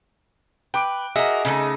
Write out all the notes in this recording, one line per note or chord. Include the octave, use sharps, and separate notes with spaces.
B4 G5 D6 D7
F#4 G#4 A#4 D#5 E5
C#3 A3 D#4